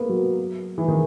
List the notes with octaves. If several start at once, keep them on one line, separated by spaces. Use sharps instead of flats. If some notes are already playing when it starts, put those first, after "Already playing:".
Already playing: A#3 B3
F#3
E3
D#3